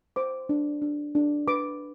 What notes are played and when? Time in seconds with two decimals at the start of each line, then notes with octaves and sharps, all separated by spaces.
0.16 C5 D6
0.49 D4
0.82 D4
1.15 D4
1.48 B4 D6